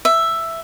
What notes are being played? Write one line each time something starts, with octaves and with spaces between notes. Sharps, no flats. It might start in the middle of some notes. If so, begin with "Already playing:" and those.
E5